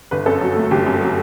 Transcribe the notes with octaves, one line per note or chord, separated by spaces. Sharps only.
G1 B4
F#2 A4
F#3
A3
G1 G4
F#2
F#3